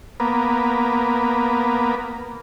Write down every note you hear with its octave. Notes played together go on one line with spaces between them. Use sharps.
A#3 B3